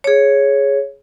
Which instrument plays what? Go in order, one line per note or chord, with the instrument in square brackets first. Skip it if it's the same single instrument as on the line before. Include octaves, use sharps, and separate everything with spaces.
[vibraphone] G#4 C#5